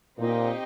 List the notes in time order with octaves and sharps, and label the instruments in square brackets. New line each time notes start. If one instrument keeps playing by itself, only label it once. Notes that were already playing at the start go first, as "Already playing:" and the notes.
[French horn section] A#2 [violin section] C4 D#4 G4 C5 D#5